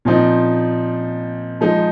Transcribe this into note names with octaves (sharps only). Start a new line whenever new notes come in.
A#2 F3 C4 D#4
F3 G#3 D#4